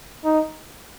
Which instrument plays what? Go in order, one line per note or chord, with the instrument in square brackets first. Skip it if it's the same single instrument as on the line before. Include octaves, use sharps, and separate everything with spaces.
[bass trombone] D#4